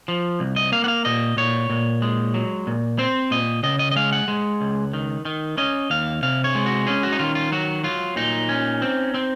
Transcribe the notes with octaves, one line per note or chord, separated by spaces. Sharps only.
F3
C2
D#5
A#3 F5
F#5
F5
A#2 D#5
A#2 C#5
A#2
G#3
F#3
A#2
C4 C5
A#2 D#5
C#3 D#5
D#5
D#5
G#3 F5
F#5
G#3
C#2
D#3
D#3
C#4 D#5
D#2 F5
C3 F5
C#5
G#3
F#4
C#4 G#4
F#4
D#4
D#3 F4
F4
F#3 F#4
F#3 F4
A#2 D#4
C#4
C4
C4